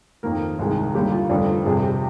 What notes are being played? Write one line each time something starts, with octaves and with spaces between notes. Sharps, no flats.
F2 D#3 A#3 A#4
C2 C3 D#3 G#3
D#2 D3 G3 A#3 G4
F4
F1 F2 D3 G3 D4
F4
F2 C3 G3 G#4
G4